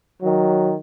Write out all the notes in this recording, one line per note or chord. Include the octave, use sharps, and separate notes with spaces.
D#3 F#3